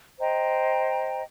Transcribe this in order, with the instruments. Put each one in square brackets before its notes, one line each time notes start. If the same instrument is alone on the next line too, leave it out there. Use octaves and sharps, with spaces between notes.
[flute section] C5 D#5 G5 A#5